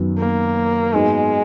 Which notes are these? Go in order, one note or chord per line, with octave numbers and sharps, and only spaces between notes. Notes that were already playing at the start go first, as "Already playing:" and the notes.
Already playing: F#2 D#3 F#3 B3
A#3
G#2 F#3 G#3 B3 D#4 G#4